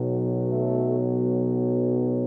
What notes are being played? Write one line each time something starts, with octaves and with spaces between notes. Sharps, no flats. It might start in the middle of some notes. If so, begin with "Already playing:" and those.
Already playing: B1 B2 F#3
A3